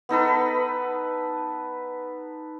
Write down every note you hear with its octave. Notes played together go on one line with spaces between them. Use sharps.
B3 D#4 A4 B4